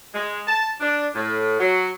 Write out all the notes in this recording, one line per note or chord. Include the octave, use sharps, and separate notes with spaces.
G#3
A5
D4
A2
F#3